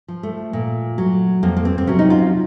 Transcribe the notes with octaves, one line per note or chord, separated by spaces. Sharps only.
F3
A3
A#2
F#3
F2 A#3
A#3
C4
C4
C3 F#3 C#4
D#4
F4